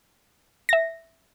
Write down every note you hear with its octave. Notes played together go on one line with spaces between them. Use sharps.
E5 A#6